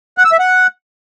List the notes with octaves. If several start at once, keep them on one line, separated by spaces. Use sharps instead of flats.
F#5
E6
E5
F#5